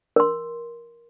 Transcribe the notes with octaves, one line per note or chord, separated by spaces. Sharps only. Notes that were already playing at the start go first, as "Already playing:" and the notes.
A#4 C6